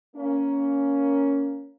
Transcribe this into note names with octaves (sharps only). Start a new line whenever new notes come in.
A#3 C#4